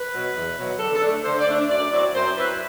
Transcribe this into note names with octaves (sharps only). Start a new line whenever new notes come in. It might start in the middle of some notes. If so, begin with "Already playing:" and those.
Already playing: B4
B2 F#3
E2
B2 F#3
D3 A4
A4
A3 D4
D3 C5
D5
A3 D4
F#2 D5
F#3 C4 E4 D5
F#2 C5
F#3 C4 E4 B4